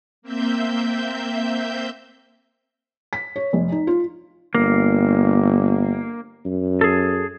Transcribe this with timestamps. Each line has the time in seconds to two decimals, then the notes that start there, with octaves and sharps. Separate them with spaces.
0.22 A#3 C4 E5 G6
3.13 B6
3.36 C#5
3.53 F1
3.72 D#4
3.87 F4
4.55 G1 A#3
6.45 F#2
6.81 G#4 A4